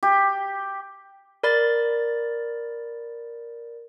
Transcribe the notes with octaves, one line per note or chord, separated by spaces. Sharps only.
G4
A#4 D5 B5 A6